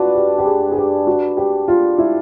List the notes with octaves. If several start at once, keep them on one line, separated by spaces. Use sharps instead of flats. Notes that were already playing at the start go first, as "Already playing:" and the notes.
Already playing: D4 F4 F#4 B4
G4
G4
G#4
G#4
G4
F#4
G4
F4
E4